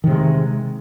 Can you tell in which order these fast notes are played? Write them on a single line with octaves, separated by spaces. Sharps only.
D#3 C3 G#3